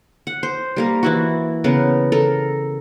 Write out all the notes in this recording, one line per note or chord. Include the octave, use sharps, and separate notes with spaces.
F#5
C5
G3 A#3 A#4
E3 E4 F#4
C#3 B3 A#4
A4 A#4